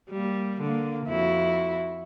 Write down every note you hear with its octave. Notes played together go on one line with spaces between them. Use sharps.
G3 A#3
D3 A#3
F2 E4 F#4